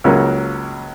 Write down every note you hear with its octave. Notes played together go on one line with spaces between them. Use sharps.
C#2 C#3 F#3 A#3 C#4